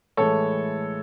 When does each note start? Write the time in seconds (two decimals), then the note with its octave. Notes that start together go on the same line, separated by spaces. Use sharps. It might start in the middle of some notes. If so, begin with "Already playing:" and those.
0.17 A2 E3 G#3 A4 C#5